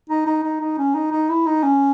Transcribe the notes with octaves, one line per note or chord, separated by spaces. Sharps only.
D#4
D#4
D#4
D#4
C#4
D#4
D#4
E4
D#4
C#4